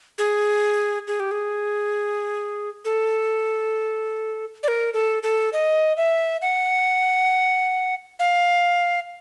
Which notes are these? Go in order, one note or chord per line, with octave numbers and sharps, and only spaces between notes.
G#4
G#4
G4
G#4
A4
D5
A#4
A4
A4
D#5
E5
F#5
F5